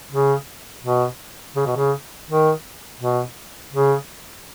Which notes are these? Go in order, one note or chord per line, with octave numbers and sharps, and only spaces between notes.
C#3
B2
C#3
B2
C#3
D#3
B2
C#3